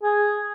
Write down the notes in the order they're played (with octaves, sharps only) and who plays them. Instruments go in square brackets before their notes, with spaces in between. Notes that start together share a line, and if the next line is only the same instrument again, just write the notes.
[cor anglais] G#4